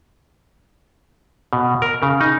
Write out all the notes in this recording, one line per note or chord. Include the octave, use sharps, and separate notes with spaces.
B2
A#4
C#3
D#4